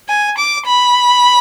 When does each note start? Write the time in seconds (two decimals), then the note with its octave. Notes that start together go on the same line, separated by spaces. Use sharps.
0.09 G#5
0.38 D6
0.67 B5